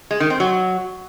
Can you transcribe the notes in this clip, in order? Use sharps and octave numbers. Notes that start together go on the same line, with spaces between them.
G#3
D#3
C4
F#3